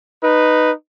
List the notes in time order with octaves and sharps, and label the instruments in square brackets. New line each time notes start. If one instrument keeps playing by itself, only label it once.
[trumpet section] D#4 B4